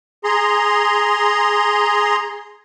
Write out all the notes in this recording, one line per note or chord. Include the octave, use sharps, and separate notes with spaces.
G#4 A#5 C6